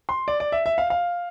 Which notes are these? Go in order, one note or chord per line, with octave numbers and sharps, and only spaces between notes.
C6
D5
D5
E5
E5
F5
F5